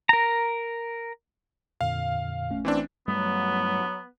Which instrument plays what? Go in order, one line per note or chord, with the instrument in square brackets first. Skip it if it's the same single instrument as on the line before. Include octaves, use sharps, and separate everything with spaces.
[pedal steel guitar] A#4 A#5
[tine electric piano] F2 A#2 D3 [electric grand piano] F5
[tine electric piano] A1 A3 C#4
[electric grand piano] E3 C4 D4
[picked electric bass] G2 G3 A3 [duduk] F#3 [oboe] B3